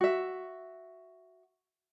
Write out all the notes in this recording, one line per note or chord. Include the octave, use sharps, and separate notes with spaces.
F#4 E5